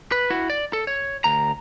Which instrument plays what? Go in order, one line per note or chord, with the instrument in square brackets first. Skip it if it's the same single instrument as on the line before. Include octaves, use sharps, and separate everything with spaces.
[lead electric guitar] B4
E4 F#4
D5
A4
C#5
D2 A#5